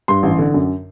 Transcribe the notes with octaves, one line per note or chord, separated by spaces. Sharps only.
G2 C6
A1
D3
F#2